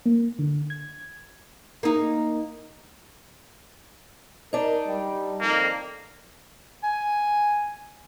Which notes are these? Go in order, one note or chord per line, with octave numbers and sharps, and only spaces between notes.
A#3
D3
G#6
A#3 D#4
D4 D#4 A#4
G3
F2 D#3 A#3
G#5